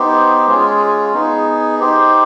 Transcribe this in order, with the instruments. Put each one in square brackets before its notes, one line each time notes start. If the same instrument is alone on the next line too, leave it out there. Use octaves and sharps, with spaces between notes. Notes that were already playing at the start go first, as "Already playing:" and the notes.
Already playing: [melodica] B3 D#4 G4 C5
G#3 C#4 F4 G#4
B3 D#4 G#4
D#4 G4 C5